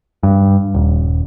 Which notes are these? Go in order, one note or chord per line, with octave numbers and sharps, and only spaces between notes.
G2
D#1